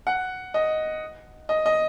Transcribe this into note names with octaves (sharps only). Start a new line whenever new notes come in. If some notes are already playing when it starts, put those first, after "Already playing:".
F#5
D#5
D#5
D#5